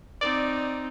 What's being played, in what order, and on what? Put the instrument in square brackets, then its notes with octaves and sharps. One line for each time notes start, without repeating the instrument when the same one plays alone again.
[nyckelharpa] C4 D#4 [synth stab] D5